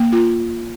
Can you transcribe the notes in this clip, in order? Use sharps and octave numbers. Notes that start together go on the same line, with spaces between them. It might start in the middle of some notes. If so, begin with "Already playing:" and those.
Already playing: A#3
F4